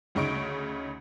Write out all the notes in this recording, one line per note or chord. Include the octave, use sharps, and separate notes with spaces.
D2 C#3 D#4 C#6 D7